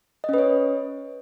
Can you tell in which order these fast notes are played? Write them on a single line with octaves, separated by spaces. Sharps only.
D#5 C#4 B4 C#5